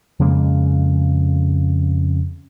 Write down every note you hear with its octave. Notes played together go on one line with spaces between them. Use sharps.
F2 C#3 G#3 A#3